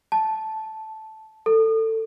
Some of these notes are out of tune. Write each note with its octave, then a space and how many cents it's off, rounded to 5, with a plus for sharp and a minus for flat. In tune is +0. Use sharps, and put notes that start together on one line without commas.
A5 -5
A4 +20